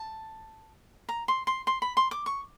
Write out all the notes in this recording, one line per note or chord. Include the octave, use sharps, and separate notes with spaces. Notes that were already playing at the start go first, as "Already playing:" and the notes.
Already playing: A5
A#5
C6
C6
C6
B5
C6
D6
C#6